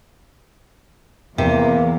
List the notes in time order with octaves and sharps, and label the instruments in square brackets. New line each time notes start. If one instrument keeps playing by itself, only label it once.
[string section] E2 [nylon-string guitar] C3 [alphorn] A#3